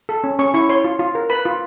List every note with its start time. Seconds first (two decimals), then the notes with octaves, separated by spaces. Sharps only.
0.09 A4
0.24 C#4
0.39 C#4 C#6
0.54 E4 C#6
0.69 C#5 C6
0.84 F4
0.99 F4
1.15 A#4
1.30 B4 B5
1.45 F4